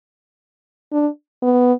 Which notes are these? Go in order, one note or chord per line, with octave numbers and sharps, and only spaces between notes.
D4
B3